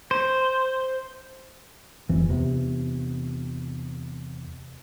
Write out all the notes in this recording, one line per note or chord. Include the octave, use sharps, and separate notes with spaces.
C5
E1 F2 E3
E2 C3